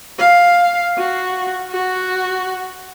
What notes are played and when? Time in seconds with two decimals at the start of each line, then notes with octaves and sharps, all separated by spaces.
0.19 F5
0.98 F#4
1.71 F#4